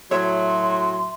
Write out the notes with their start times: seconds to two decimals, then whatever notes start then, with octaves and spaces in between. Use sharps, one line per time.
0.11 A2 F#3 C#5 E5 C6